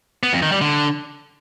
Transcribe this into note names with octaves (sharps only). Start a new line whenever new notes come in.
B3
F2
D#3
G3
D3